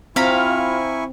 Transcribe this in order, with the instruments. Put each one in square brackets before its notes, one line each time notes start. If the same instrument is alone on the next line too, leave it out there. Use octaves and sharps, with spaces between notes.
[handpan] C4 [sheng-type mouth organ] E4 G#5 C#6 [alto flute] F4 [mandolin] F5 A#5 B5